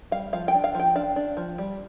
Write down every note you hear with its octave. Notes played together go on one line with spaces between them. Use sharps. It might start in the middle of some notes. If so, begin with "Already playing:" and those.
G3 F5
F3 F5
G5
D4
F5
F3
G5
D4 F5
D4
F3
G3